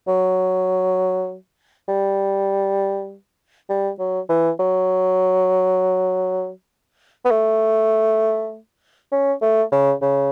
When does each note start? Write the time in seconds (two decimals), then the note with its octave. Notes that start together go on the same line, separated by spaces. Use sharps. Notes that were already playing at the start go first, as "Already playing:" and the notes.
0.08 F#3
1.88 G3
3.69 G3
3.99 F#3
4.29 E3
4.59 F#3
7.25 B3
7.31 A3
9.12 C#4
9.42 A3
9.72 C#3
10.02 C#3